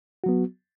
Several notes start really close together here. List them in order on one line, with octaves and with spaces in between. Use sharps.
F#4 F#3 B3